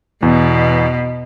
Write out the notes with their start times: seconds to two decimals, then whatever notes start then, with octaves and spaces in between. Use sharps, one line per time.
0.23 E2 B2